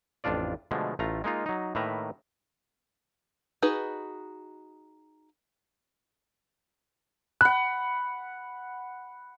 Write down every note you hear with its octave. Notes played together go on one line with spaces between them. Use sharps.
A1 F2 D4 F4 D5
B2 D3 F3 G#3 A3
A1 A3 F4 A#5
G#3 A#3 D#4 F4
F#3 D#4
A2 D#3 A#3 B4 E5 A#5
D#4 F#4 G#4 B4
F#5 B5 F#6